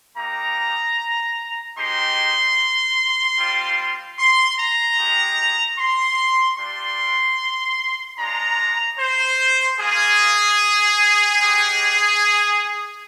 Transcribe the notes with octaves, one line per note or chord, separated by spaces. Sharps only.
A#3 D#4 G4 A#5
G#3 C4 D#4 G4 C6
G3 C4 F4
C6
A#5
G#3 D#4 G4
C6
G3 D4 F4 C6
G#3 D4 F4 A#5
C5
A#3 F4 G#4
G#3 D#4 G4